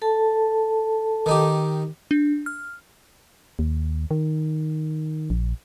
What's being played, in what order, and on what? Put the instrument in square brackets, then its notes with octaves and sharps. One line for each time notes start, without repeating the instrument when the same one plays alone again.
[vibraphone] A4 A5
[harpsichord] D#3 D#4 G4
[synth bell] D4
F6
[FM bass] D#2
D#3
A#1